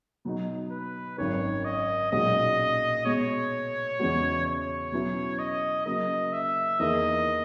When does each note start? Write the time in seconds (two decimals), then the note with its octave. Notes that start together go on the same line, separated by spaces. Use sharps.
0.25 B2 F#3 B3 D#4
0.71 B4
1.18 G#1 F#2 D#3 C#5
1.65 D#5
2.12 B1 A#2 G#3 C#4 F#4 D#5
3.05 B2 G#3 B3 C#5
3.99 E2 C#3 G#3 B3 F#4
4.46 C#5
4.92 B2 F#3 C#4 E4 B4
5.39 D#5
5.86 C#3 F#3 A#3 D#5
6.33 E5
6.79 E2 D#3 A#3 E4 G#4 D#5